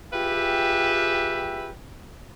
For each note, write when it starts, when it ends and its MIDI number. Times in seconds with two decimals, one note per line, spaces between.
0.13 1.70 65
0.13 1.70 67
0.13 1.70 68
0.13 1.70 71
0.13 1.70 76
0.13 1.70 79